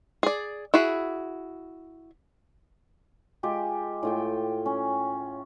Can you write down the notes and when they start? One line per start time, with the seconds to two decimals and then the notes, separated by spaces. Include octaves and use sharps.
0.23 G#4 D5
0.74 E4 F#4 G#4
3.43 G#3 F4 G4
4.03 A2 F4 G5
4.66 C#4